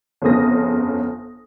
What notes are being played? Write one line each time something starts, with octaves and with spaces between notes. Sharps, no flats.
G1 F2 C#3 D#6 A#6